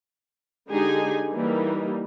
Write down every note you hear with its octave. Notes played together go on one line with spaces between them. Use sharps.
D3 G#3 D#4 G4 G#4 G#5
E3 G3 A#3 D#4